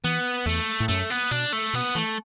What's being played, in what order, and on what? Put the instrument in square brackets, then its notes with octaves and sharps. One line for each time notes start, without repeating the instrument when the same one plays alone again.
[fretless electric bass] E3 [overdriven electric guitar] B3
[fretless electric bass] E2 [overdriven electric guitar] A3
[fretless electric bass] A2
[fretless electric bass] F#2 [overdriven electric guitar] A3
[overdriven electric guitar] B3
[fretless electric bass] B2 [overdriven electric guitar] D4
[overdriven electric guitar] A3
[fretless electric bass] B2 [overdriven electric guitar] B3
[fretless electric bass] E3 [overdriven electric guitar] A3